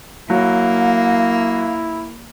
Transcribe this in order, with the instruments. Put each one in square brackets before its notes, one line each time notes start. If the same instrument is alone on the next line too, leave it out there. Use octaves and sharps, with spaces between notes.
[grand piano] F#3 [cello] A#3 [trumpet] E4 [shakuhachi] F5